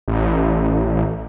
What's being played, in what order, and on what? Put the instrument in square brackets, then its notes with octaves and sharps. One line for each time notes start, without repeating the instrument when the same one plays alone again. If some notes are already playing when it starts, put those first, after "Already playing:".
[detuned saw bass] A1